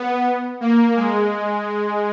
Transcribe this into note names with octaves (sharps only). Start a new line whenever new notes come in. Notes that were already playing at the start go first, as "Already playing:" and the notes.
Already playing: B3
A#3
G#3